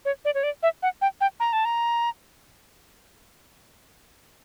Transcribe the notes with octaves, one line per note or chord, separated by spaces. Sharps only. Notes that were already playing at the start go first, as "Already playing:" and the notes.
C#5
D5
C#5
D5
E5
F#5
G5
G5
A#5
A5
A#5